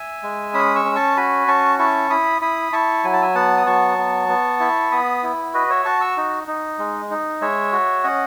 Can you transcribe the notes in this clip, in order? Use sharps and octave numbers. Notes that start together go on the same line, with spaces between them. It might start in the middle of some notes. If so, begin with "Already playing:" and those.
Already playing: E5 G#5
G#3
C#4 B5 D#6
C#6 E6
C#4
A5 C#6
F#4 G#5 B5
C#4 A5 C#6
E4 A5 C#6
E4 B5 D#6
E4 B5 D#6
E4 A5 C#6
F#3 G#5
A5
E5 G#5
B3 F#5 A5
D#6
F#3 A5 C#6
B3
B3
E4
B3 B5 D#6
E4
F#4 B4 D#5
C#5 E5
F#4 A5 C#6
C#6 E6
D#4
D#4
G#3
D#4
G#3 C#5 E5
F#4
C#4 D#5 F#5